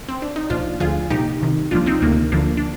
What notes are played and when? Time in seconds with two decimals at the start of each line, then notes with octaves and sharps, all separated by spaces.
0.09 C4
0.22 D4
0.36 D#4
0.50 C2 A#2 F3 D4 F4
0.80 D2 D3 F3 F4 G#4
1.10 C2 A#2 F3 D#4 G4
1.41 C2 C3 D#3
1.71 C2 A#2 F3 D4 F4
1.86 C4 D#4
2.02 D2 C3 D#3 A#3
2.32 D2 D3 F3 A#3 D4
2.57 D4